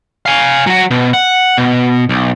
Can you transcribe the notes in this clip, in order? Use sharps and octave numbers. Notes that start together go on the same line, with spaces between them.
F5 G#5
F#3 F#4
B2
F#5
B2
B1